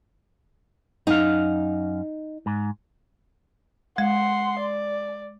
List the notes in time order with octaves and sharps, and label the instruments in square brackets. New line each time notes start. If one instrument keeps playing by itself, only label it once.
[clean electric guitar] F#2 F5 [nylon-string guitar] D#4
[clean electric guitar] G#2
[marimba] G#3 [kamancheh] F#5 C6
[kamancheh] D5